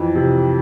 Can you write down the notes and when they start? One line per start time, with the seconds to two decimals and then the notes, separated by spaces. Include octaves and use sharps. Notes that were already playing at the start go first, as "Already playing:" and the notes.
Already playing: F2 E3
0.15 C3